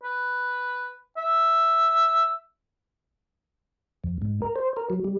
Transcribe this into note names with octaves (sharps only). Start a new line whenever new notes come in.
B4
E5
F2
G#2
A#4
C5
A#4
F#3
G3